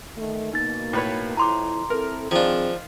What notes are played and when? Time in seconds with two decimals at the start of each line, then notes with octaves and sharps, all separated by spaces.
0.17 D#3 A3
0.53 B2 A#3 D#4 A6
0.93 A2 B4 C#5
1.37 F2 E4 A#5 C6 D6
1.90 C4 E4 A4 A#4
2.31 D#3 F3 C4 D4 F4 G#4